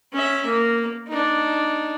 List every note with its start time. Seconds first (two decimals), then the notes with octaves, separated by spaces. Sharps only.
0.13 C#4 E5
0.45 A#3
1.08 D4 D#4